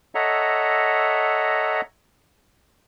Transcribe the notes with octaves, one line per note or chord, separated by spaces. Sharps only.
A4 C#5 D#5 E5 F#5 A#5